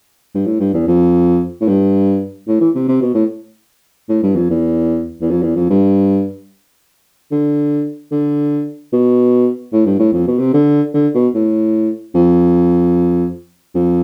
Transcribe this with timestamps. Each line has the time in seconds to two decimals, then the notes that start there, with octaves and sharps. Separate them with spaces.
0.35 G2
0.46 A2
0.60 G2
0.74 E2
0.87 F2
1.61 A2
1.68 G2
2.47 A2
2.60 E3
2.75 C3
2.88 C3
3.01 B2
3.14 A2
4.09 A2
4.23 G2
4.35 F2
4.50 E2
5.21 E2
5.30 F2
5.42 E2
5.56 F2
5.70 G2
7.31 D3
8.12 D3
8.92 B2
9.73 A2
9.86 G2
9.99 A2
10.13 F2
10.27 B2
10.39 C3
10.53 D3
10.94 D3
11.14 B2
11.34 A2
12.14 F2
13.75 F2